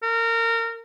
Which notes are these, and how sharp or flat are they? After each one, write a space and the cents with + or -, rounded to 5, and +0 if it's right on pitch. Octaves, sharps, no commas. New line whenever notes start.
A#4 -25